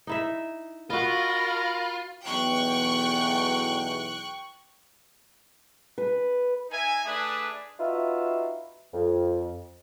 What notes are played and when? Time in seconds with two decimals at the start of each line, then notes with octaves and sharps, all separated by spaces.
0.07 D#4 E4 E5
0.90 F4 F#4 A#4 D#5 B5
2.27 B1 E2 G5 C#6 F#6
5.98 B4
6.70 D#4 E5 G#5
7.05 A3 D4 G#4 B4
7.80 D#4 F4 F#4 B4 E5
8.94 F2